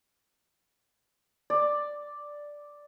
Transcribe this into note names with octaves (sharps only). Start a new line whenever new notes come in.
D5